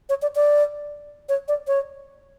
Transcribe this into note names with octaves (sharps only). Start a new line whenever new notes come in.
C#5
D5
D5
C#5
D5
C#5